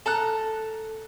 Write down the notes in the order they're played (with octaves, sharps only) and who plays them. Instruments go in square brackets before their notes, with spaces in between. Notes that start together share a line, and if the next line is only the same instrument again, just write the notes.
[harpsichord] A4 [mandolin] A5 A#5 F#6